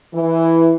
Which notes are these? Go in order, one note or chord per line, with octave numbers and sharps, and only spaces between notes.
E3